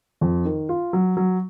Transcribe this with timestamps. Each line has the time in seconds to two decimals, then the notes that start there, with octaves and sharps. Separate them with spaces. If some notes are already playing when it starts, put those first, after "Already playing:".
0.21 F2
0.45 D#3
0.69 F4
0.93 F#3
1.17 F#3